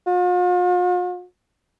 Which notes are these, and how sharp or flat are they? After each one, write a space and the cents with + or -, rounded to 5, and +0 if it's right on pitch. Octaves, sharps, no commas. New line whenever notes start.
F4 +45